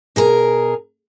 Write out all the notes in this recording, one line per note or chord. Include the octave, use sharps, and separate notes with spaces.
B2 G#4 A#4